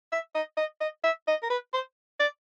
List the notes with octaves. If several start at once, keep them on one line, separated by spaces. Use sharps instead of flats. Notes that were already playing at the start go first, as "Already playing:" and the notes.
E5
D#5
D#5
D#5
E5
D#5
A#4
B4
C5
D5